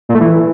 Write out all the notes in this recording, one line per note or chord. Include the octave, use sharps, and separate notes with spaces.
A#2
A3
E3